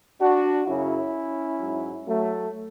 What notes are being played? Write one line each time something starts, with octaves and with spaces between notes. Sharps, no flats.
D4 F#4
F#2 C#3 F#3 C#4 E4
G#2 F#3
F#3 A3